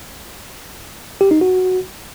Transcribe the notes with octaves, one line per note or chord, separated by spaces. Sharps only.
G4
D#4
F#4